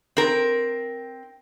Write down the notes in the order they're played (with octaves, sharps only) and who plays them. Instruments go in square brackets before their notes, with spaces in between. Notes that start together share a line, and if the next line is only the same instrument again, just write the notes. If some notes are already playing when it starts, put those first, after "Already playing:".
[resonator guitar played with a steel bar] C4 A#4